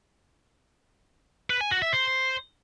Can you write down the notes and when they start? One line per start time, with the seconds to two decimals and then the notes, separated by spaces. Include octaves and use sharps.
1.50 B4
1.61 G#5
1.71 F#4
1.82 E5
1.93 C5